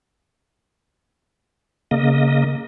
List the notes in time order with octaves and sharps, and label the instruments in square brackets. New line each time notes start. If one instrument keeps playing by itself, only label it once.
[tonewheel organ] C#3 A#3 D#5